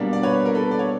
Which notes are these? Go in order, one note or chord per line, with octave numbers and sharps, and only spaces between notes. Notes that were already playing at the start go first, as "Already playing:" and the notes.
Already playing: B2 G3 A#3 D4
D5
B4 C#5
A#4
A4 B4
D5
C#5